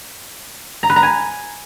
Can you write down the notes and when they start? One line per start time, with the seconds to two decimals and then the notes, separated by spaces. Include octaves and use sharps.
0.83 A#5
0.90 B4
0.96 A#5
1.03 G#5